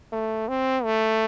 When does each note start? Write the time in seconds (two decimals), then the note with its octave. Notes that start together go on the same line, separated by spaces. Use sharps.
0.12 A3
0.48 C4
0.84 A3